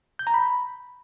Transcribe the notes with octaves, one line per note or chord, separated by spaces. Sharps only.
G6
A#5
B5